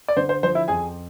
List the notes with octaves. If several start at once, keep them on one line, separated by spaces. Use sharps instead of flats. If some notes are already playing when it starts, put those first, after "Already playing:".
D5
D3 C5
C5
F3 C5
E4 E5
F2 G#4 G#5